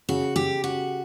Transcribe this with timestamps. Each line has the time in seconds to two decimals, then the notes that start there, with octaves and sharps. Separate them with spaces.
0.09 C#3 F#4
0.36 C#3 G4
0.64 C#3 F#4